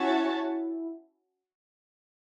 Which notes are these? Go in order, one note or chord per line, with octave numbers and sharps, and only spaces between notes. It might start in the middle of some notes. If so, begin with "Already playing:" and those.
Already playing: C#4 E4 F#4 C#5 E5 A5